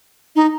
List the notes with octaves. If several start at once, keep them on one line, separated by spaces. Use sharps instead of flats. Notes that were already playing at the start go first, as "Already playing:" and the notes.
D#4